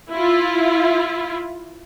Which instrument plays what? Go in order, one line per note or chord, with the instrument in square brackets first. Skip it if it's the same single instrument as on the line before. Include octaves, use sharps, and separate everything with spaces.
[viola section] E4 F4